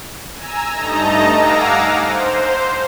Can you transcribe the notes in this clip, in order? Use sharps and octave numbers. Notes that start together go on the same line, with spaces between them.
G#5 A#5 E6
G2 A3 D#4 D#5 A5 A#5
F5 F#5 G#5 A#5 D6 E6
C5